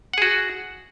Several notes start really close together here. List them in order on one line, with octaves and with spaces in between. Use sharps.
F#5 G#4 F#4